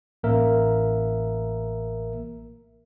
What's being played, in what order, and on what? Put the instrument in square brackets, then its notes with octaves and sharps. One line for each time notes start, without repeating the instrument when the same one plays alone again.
[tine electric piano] A1 A#3 A#4 E5